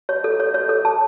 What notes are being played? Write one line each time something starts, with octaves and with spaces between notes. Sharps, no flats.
C#5
A4
C#5
C#5
A4
A5